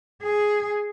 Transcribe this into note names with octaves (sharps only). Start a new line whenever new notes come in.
G#4